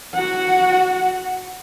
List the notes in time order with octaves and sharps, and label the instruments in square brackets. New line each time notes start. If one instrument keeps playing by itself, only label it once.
[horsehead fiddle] F#4 F#5